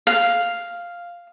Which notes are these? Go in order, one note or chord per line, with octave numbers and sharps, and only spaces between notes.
F5